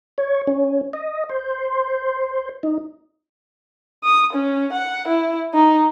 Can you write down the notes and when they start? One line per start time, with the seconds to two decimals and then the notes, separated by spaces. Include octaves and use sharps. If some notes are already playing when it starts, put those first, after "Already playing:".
0.18 C#5
0.47 C#4
0.93 D#5
1.29 C5
2.63 D#4
4.04 D#6
4.33 C#4
4.72 F#5
5.08 E4
5.54 D#4